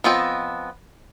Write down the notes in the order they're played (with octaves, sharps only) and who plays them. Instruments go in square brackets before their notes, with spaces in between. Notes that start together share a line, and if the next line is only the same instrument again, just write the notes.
[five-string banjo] F3 B3 C4 D#5